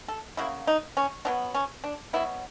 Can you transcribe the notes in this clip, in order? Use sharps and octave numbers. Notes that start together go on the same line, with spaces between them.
A4
C#3 F#3 A#3 E4
D#4
C#4
B2 F#3 B3 D4
C#4
D4
B2 F#3 B3 E4